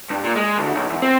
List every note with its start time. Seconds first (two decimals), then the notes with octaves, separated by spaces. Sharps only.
0.10 G2
0.24 A#2
0.35 G#3
0.58 D2
0.75 B1
0.90 E2
1.02 C4